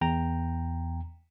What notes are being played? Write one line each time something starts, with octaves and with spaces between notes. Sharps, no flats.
E2 G5 A#5